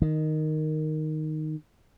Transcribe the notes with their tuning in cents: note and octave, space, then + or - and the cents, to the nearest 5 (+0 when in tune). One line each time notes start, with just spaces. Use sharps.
D#3 -5